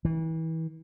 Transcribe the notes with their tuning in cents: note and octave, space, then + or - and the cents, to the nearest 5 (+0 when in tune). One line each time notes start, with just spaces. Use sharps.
E3 -35